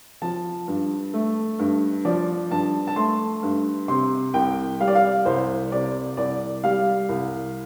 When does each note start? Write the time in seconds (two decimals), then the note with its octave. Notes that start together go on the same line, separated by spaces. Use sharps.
0.22 F3 A5
0.68 G2
1.14 A3
1.59 G2
2.05 F3 D5
2.51 G2 A5
2.87 A5
2.96 A3 C6
3.43 G2
3.88 C3 C6
4.34 C2 G5
4.80 G3 F5
4.87 D5
4.95 F5
5.25 C2 C5
5.72 C3 D5
6.17 C2 D5
6.64 G3 F5
7.09 C2